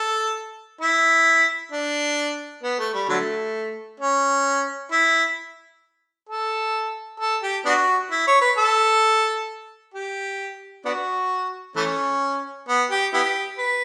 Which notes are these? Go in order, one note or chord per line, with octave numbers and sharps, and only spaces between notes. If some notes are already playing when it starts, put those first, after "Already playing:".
Already playing: A4
E4
D4
B3
A3
G3
D3 F#3 A3
C#4
E4
A4
A4
G4
B3 D4 F#4
E4
C#5
B4
A4
G4
B3 D4 F#4
E3 A3 C#4
B3
G4
B3 E4 G4
B4